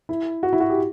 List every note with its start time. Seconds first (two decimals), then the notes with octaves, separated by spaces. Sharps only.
0.09 E4
0.43 F#4
0.53 E4
0.60 F#4
0.70 G4